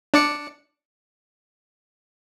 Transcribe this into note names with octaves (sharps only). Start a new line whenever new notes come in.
D4 D5 C#7